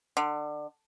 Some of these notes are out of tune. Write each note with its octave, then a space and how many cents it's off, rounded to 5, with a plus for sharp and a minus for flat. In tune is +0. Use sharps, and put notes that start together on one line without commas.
D3 +25